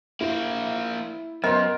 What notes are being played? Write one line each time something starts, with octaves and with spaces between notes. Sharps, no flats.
A#3 E4 C5
F#2 B3 A#4 C5 D#5